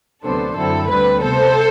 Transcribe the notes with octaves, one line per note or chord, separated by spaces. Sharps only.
D2 C3 F#3 B3 D4 A4 C5
F#2 D3 F#3 C4 E4 A4
D2 D3 G3 C4 B4
C3 G3 B3 A4 C5